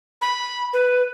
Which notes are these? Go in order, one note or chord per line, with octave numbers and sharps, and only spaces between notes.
B5
B4